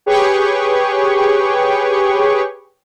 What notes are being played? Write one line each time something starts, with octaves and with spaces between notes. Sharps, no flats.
G4 G#4 B4 C#5 G5 C#6